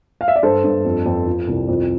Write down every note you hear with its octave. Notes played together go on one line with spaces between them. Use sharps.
F5
E5
D5
G2 A4 C5
G2
F2
F2
F3
C2
F2